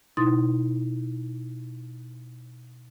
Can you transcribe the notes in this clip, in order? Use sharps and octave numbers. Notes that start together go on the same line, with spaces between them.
B2 D#4 E4 C6 D#6 A6